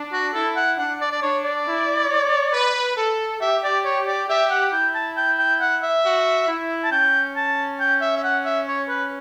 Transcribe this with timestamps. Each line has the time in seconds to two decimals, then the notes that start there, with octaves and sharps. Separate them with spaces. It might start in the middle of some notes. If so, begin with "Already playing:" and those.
Already playing: D4
0.13 F#4
0.34 E4 A4
0.56 F#5
0.78 D4 F#5
1.01 D5
1.12 D5
1.22 D4 C#5
1.44 D5
1.66 E4
2.10 C#5
2.53 B4
2.97 A4
3.41 G4 E5
3.64 D5
3.85 C#5
4.07 D5
4.29 G4 E5
4.51 F#5
4.72 E4 G5
4.95 A5
5.17 G5
5.39 G5
5.60 F#5
5.83 E5
6.04 F#4
6.48 E4
6.84 A5
6.92 C#4 G5
7.36 A5
7.80 G5
8.01 E5
8.17 E5
8.24 F#5
8.45 E5
8.68 C#5
8.89 B4